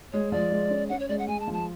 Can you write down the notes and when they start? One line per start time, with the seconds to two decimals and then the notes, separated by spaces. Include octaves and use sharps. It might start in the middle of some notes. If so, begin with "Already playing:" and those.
0.13 G#3 C#5
0.32 F3 D5
0.51 G#3
0.70 C#4
0.89 C#4 F#5
0.99 C#5
1.09 G#3 D5
1.19 F#5
1.28 G#3 G#5
1.40 A5
1.48 F3
1.53 A5